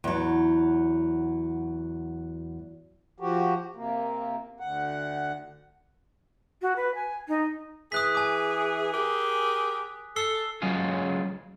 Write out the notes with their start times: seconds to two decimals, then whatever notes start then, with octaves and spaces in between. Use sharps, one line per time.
0.04 E2 F#3
3.20 F3 F#4 G4
3.76 C3 A#3
4.60 D2 F#5
6.62 F#4
6.76 B4
6.95 G#5
7.28 D#4
7.92 E3 G#4 D#6 F#6 B6
8.15 G#5 D6
8.92 G4 G#4 A#4
10.16 A4 E6 C7 G7
10.62 F#3 G#3 C#4 F4 G#4